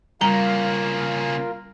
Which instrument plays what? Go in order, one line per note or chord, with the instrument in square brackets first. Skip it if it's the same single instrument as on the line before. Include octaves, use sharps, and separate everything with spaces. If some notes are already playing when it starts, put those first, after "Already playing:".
[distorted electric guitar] C#3 A#3 [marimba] G3 [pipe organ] F4 A#4 [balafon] A#5